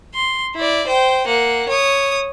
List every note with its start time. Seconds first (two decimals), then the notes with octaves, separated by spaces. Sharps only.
0.15 C6
0.56 E4 D5
0.87 C5 G5
1.27 A#3 F#5
1.69 C#5 D#6